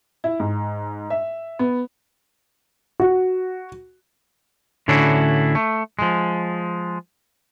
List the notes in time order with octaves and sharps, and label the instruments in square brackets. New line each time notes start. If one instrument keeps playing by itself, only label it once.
[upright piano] E4
G#2
E5
B3
[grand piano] F#4
[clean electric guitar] A2 D3 C#4 D4 E4 F#4
A3
F3 G#3